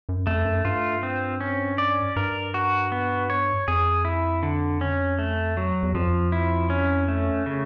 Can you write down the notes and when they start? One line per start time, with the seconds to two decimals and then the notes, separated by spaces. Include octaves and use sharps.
0.09 F#2
0.27 F2 A3
0.45 F#2
0.65 G2 F4
1.03 C4
1.40 C#4
1.78 D5
2.16 G2 A#4
2.54 F#4
2.92 B3
3.30 C#5
3.68 F2 G#4
4.05 E4
4.43 D3
4.81 C#4
5.19 A3
5.57 F#3
5.83 E2
5.94 F2 F3
6.32 E4
6.70 C#4
7.08 A3
7.46 C#3